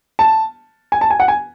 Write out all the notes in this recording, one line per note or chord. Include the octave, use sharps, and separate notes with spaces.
A5
G#5
A5
G#5
F#5
G#5